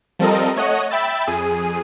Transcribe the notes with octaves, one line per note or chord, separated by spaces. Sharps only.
F3 G3 C4 A4 A#4 D#5
A3 C#5 D#5 F#5 D#7
E5 G5 B5 E6 A6
F2 G#4 D#7